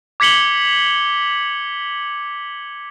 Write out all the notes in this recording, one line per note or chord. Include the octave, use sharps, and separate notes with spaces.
D6 G#6 B6 C#7 F#7 G7